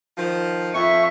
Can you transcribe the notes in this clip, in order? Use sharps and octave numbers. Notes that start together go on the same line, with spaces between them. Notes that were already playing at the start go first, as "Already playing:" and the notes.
D#3 F3
F2 E5 C#6